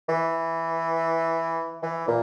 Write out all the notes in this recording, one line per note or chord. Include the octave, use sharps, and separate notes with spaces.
E3
E3
A#2